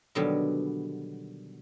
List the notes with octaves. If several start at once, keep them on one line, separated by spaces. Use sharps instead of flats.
B2 D3 D#3 F#3 G3 B3